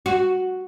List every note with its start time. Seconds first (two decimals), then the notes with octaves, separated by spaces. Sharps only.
0.06 F#4